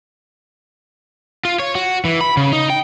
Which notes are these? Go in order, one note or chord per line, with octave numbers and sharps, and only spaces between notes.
F4
C#5
F#4
E3
B5
C#3
D#4
G5